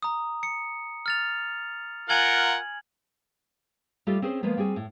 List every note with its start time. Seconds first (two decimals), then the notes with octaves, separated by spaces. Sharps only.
0.02 A#5 D#6
0.43 C#7
1.06 F6 A6 F7
2.09 F4 A#4 F#5 G#5 G#6 F#7
4.07 G3 A3 F4 G4 A4 D#5
4.22 C4 C#4 G#4 C5
4.43 F3 G#3 A#3 B3
4.57 G3 C4 F#4 G#4
4.76 A2